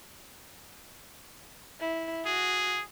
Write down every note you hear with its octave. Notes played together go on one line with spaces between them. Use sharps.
E4
F#4 G#4